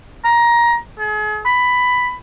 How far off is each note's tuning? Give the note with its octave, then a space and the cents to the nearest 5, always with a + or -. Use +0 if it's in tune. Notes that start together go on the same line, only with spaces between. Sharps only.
A#5 +20
G#4 +40
B5 +10